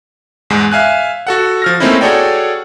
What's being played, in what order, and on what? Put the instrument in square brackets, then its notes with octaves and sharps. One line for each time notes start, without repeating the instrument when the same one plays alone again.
[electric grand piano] E2 G#2 G#3
E5 F5 G#5 F#6
F#4 A4 F#5
F3 F6 A#6
A3 A#3 C4 C#4 D#4 E4
F#4 G#4 A4 C#5 D5 G5